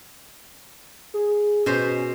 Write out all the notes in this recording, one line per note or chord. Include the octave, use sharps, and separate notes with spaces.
G#4
B2 C#4 C5